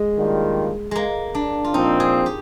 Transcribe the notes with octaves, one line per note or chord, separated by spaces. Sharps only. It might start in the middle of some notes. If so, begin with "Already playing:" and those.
Already playing: G#3
D#3 G3 A#3 D4 F4
G#3 A#3
D4
F4
A#2 F3 C4 D#4
G#4
G4